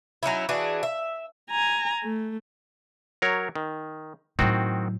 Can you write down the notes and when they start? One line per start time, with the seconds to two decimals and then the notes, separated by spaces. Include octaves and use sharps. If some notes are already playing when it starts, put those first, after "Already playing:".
0.23 F#3 C#4 D#4 E4
0.49 E3 D4 F#4 G#4
0.83 E5
1.50 G#5 A#5
2.03 A3
3.22 F#3 A#4 C#5
3.55 D#3
4.39 A2 D#3 F#3 C4 F#4